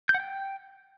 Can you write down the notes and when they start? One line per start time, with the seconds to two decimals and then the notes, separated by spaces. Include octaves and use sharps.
0.09 G6
0.14 F#5
0.20 G5